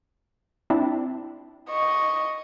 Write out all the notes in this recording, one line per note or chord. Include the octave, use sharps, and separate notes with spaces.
C4 D4 E4
D#5 C#6